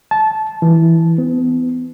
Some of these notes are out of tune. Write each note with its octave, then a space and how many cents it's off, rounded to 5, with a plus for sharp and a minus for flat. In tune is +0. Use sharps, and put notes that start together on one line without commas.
A5 -15
E3 -5
B3 +35